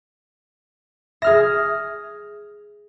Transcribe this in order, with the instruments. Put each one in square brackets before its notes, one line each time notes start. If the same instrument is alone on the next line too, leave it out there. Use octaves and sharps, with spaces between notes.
[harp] G#4 F6 A#6 [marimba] E5